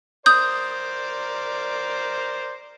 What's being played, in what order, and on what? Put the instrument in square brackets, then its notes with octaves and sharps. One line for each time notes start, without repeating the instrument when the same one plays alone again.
[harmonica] A#4 C5 D5 [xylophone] D#6 G6